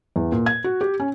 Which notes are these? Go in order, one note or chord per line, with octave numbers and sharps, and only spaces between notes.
E2
A#2
G#6
F#4
G4
C#4